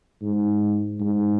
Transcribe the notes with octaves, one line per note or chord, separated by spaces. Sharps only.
G#2
G#2